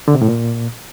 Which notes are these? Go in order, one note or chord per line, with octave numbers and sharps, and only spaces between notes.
D3
C3
A2
A#2